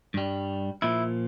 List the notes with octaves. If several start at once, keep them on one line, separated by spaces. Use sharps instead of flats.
G2 G3
A#2 F3 E4